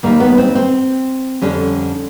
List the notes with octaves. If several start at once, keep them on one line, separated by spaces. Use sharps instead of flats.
D#2 D#3 G3 A#3
B3
C4
C4
F2 D3 G3 C#4